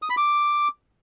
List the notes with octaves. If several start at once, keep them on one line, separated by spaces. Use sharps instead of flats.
D#6
B5
D6